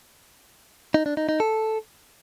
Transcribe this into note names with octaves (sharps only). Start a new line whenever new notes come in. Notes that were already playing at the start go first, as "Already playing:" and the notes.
D#4
D4
D#4
D#4
A4